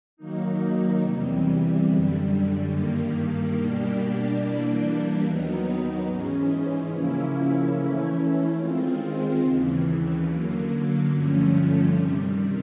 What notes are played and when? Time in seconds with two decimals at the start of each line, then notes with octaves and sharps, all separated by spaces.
0.17 D#3 F#3 A#3 D#4
1.01 E2 C3 E3 G3
1.85 F#2 D3 G3
2.69 G2 D#3 G3 A#3
3.52 B2 G3 A#3 D4 G4
4.37 E3 G3 A#3 D4
5.21 D#2 D#3 F#3 B3 D#4
6.04 G#2 E3 G#3 C#4
6.88 C#3 F3 A#3 C#4 E4
7.73 E3 A3 C#4 E4
8.56 D#3 G#3 C4 F4
9.40 D#2 C#3 E3
10.25 D3 F#3 A#3
11.08 G2 D3 F3 A3 C#4
11.93 C3 D#3 G3